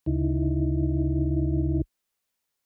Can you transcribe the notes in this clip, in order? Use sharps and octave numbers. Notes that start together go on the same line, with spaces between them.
D2 C#3 D#4 E4